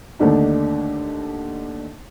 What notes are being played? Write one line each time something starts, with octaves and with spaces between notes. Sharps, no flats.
D#2 D3 A3 D4 D#4